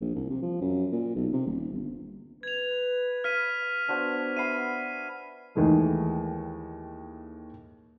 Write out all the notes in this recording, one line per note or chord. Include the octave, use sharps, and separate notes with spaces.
A#1
C2
C3
F3
F#2
A#2
B1
C3
D#1
G1
B4 G#6 F7
F5 F6 B6 D#7
B3 D4 F#4 C5
E5 F#5 B5 C7 D#7
D#2 D#3 E3 G#3 A3